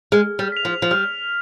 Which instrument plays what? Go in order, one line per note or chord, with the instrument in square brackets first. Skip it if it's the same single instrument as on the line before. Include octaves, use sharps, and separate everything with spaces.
[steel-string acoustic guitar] G#3 [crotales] F6
[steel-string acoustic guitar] G3
[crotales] B6 F7
[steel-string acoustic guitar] F3
F3
[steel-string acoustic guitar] G3 [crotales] F6